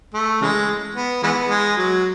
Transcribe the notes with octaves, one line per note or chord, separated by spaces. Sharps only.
A3
C#3 E3 G#3
B3
E3 G#3 B3
G#3
F#3